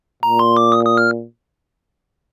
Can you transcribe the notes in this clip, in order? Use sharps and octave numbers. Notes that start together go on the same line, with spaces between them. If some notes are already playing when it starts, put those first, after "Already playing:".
A#2 A#5
C6
D6
D#6
D#6
F6